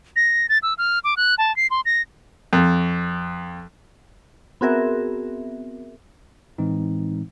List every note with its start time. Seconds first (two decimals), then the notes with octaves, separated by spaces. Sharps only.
0.16 A#6
0.49 A6
0.63 E6
0.78 F6
1.04 D6
1.17 F#6
1.38 A5
1.56 C7
1.71 C6
1.85 A#6
2.53 F2
4.61 B3 C4 F#4 G#4 A#4 E5
6.58 A2 E3 G#3 C4 D#4